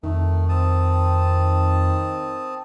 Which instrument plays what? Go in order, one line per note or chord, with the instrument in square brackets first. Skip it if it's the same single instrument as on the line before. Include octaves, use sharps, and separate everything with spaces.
[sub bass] F2 [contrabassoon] D#3 [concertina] A3
[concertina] C4 A5 D#6